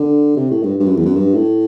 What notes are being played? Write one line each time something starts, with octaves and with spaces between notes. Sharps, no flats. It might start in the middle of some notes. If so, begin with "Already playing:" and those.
Already playing: D3
C3
A2
G2
G2
F#2
E2
F#2
G2
A2